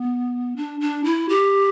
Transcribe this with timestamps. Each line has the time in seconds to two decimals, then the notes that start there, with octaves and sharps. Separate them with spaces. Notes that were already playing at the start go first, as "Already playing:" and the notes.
Already playing: B3
0.56 D4
0.81 D4
1.04 E4
1.29 G4